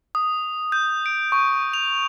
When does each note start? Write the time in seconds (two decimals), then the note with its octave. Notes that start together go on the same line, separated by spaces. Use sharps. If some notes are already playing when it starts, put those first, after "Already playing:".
0.15 D#6
0.72 G6
1.06 D7
1.32 C#6
1.74 F7